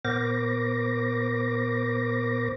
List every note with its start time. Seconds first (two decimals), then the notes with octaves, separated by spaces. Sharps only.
0.05 A#2 B3 A#4 C5 D6 A#6